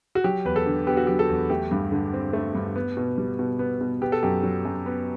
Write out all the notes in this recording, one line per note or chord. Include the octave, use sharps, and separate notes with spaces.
F#4
F#3 G4
E2 B4
A4
D3
B3 G4
F#4
F#3 G4
A4
E2
A3 G4
G2
D3
C4
A3
G2
B3
B2
G3
B2
B3
B2
B3 G4
A4
F#2 G4
F#3
F#2
B3